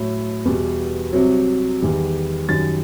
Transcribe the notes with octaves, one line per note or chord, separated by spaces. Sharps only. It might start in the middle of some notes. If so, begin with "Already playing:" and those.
Already playing: A2 F#3
E2 B2 G3
C2 C3 F#3
E2 D#3 G3
F#2 D#3 G3 A6